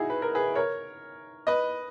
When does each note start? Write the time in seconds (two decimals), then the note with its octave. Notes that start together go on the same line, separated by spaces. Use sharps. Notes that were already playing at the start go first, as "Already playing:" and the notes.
Already playing: D#4 E4 F#4 G#4
0.10 B4
0.22 A#4
0.35 G#4 B4
0.55 A#4 C#5
1.47 B4 D#5